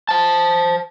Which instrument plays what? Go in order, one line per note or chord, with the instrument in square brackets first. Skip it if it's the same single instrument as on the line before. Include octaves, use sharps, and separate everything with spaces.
[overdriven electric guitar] C5 A5